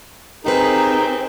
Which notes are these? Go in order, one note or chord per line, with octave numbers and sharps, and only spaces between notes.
D#2 C4 D#4 G4 G#4 A#4 B4